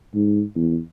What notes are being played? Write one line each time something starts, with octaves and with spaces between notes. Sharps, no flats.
G#2
E2